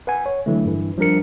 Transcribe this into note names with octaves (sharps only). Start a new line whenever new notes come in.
B4 F#5 G#5
C#5
D3 E3 F#3 A3
G2 E3
F3 G3 D4 A#4 C#7